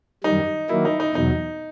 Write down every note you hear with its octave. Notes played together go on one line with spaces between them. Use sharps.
F#2 D#3 G3 D#4
D#3 F#3 A#3 E4
D#4
D#4
E2 B2 F#3 D#4